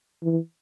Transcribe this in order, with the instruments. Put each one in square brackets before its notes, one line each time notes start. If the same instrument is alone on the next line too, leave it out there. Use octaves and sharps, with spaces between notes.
[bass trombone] E3